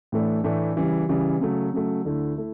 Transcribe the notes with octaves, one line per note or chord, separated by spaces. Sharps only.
A2 E3 A3 D4
A2 E3 A3 D4
C#3 E3 G3
C#3 E3 G3
C#3 F#3 A3
C#3 F#3 A3
D2 D3 A3 E4
A3 E4